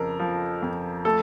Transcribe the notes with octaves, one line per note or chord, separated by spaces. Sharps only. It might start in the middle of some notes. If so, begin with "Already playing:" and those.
Already playing: F2 C#3 A4 A#4
F3
F2
A3 A4